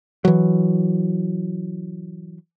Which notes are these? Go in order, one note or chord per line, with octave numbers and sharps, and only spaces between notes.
E3 F#3